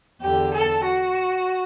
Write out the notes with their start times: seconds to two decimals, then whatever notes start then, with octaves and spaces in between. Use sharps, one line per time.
0.21 E2 D3 G4
0.54 A4
0.85 F#4